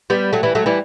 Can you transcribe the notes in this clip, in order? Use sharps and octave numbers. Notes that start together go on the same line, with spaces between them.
G3 B3
F#3 A3
E3 G3
F#3 A3
E3 G3